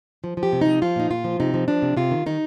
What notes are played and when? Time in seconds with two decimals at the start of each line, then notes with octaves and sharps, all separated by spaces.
0.24 F3
0.37 F3
0.43 G4
0.53 C3
0.61 D#4
0.67 F3
0.82 F3 F4
0.96 A#2 D#4
1.10 A#2 F4
1.24 F3
1.40 C3 D#4
1.54 F3
1.68 F3 D4
1.82 C3
1.97 C3 F4
2.11 D#3
2.26 D#3 D#4